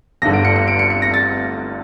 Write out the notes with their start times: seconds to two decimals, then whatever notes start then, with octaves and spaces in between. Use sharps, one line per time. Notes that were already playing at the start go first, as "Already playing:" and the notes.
0.22 G1 G2 D3 A#6
0.33 D7
0.45 C#7
0.56 C#7
0.68 D7
0.79 C#7
0.90 C#7
1.02 A#6
1.14 A6